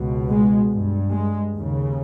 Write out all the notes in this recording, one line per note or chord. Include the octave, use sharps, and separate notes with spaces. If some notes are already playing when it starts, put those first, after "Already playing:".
Already playing: C#2 B2
G#3
G2
G#3
D#2 C#3